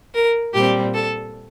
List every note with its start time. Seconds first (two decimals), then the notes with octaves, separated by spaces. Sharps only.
0.14 A#4
0.53 A#2 G3 C4 G4
0.94 A4